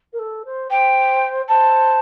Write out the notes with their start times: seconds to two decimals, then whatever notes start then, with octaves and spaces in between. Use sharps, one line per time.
0.12 A#4
0.18 A4
0.45 C5
0.71 C5 G5
1.49 C5 A5